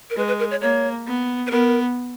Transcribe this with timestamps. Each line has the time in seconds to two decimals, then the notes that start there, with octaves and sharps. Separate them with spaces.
0.10 A#4
0.16 G#3 B4
0.28 B4
0.40 A#4
0.51 C#5
0.61 A#3 C#5
1.07 B3
1.47 B4
1.51 B3 A#4